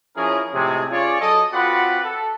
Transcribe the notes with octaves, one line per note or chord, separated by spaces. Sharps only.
F3 C#4 E4 G#4 A#4
A2 C3 F3 G#3 G#4
C#4 F4 G#4 C#5 D5
F#3 A4 D#5
C4 F4 F#4 B4 D5 F#5
A4